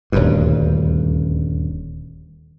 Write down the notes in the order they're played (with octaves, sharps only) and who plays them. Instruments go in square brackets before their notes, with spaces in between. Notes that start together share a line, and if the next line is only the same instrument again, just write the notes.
[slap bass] D#1 D2 G2